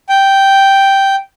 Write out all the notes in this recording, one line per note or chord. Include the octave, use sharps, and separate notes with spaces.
G5